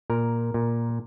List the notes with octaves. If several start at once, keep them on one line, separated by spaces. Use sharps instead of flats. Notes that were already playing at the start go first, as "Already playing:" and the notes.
A#2 A#4
A#2